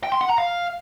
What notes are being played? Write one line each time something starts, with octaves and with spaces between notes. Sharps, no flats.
G5
C6
F#5
A#5
F5